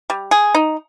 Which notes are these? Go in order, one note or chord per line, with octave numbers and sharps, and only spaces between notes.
G3
G#4
D#4